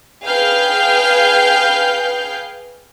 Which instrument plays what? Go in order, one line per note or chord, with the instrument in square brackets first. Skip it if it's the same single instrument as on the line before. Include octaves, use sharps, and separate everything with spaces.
[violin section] G#4 B4 F5 G5 F6 G6